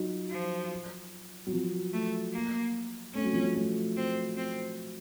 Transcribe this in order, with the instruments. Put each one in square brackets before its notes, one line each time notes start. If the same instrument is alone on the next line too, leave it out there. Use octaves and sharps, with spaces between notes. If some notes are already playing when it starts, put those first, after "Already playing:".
Already playing: [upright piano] F#3 D#4 F4
[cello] F3
[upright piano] F#3
F3
[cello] A3
A#3
[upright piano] A3 [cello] C#4
[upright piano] F#3
F3
F#3
A3
[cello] C4
C4